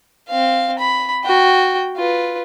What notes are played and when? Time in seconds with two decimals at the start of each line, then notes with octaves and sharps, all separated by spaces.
0.29 C4 F5
0.79 B5
1.25 F#4 G5
1.97 F4 B4